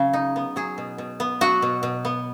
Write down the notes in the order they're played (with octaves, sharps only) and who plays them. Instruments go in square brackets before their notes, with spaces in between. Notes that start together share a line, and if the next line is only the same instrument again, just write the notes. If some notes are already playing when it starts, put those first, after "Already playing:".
Already playing: [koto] C#3 F#3
D#4
B3
F#3 G#4
B2
B2
B3
F#3 F#4
B2
B2
B3